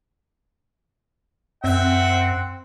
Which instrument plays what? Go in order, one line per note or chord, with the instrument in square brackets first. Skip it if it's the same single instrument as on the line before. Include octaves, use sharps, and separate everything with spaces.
[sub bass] F#2 [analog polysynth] C4 [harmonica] E5 [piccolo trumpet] F#5